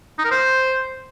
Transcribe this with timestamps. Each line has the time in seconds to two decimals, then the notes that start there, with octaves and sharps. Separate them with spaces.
0.18 D#4
0.25 A#4
0.31 C5